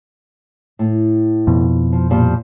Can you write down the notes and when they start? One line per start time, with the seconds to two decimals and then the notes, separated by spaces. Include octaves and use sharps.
0.79 A2
1.47 F2 B2
1.92 F3
2.10 A#2 F3 G3